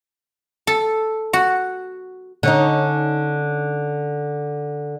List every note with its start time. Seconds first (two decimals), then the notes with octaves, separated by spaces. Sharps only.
0.67 A4
1.33 F#4
2.43 D3 C#4 D#4